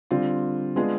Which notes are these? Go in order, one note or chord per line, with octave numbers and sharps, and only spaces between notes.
D3 G3 C4 F4
G#3 B3 D4 F4 G#4